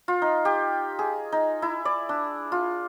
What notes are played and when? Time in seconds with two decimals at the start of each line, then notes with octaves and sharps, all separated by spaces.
0.08 F4
0.22 D#4
0.45 G4
0.99 G#4
1.32 D#4
1.62 E4
1.85 D5
2.09 D4
2.52 F4